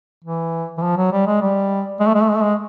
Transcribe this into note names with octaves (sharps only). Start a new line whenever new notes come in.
E3
E3
F3
F#3
G3
G#3
G3
G#3
A3
G#3
A3
G#3
A3
G#3